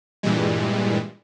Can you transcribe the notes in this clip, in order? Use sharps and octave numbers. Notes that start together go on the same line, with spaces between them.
G2 A#2 E3 G3 G#3